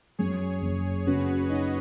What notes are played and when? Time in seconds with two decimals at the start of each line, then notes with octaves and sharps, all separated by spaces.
0.18 F#2 G#4 C#5
0.62 F#1
1.06 C#3 F#4 B4
1.49 D#4 B4 D#5